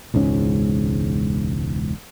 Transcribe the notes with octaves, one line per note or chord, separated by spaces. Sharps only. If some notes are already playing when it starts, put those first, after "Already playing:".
E1 C#2 G#2 C#4